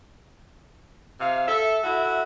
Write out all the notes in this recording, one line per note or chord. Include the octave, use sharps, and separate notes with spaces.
C3 F5
A4 E5
E4 F#4 A4 E5